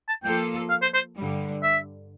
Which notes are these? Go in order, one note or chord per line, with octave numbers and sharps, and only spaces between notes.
A5
F3 A#3 F4 A4 G5
F5
C5
C5
G2 D3 G3
E5